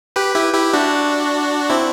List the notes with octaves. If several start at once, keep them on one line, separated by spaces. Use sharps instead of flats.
G4 B4
E4 G4
E4 G4
D4 F#4
C4 E4